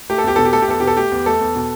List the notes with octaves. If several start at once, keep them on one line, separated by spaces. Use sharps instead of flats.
A3 G4
A4
E2 G4
B2 A4
G4
A3 A4
G4
E2 A4
B2 G4
A4
A3 G4
E2
A3 A4
E2
B2